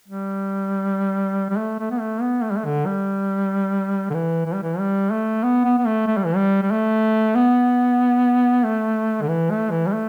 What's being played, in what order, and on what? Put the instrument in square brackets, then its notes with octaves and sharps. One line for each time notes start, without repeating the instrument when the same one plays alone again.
[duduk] G3
G3
A3
A3
B3
A3
B3
A3
G3
A3
D3
G3
D3
E3
E3
G3
E3
G3
A3
B3
B3
B3
A3
A3
G3
E3
G3
G3
A3
B3
A3
D3
E3
A3
E3
G3
A3